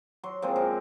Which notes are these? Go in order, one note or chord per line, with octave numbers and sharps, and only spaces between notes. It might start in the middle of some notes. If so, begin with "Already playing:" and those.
F#3 C6
F3 G#3 A#3 C4
F#2 A#2 A#4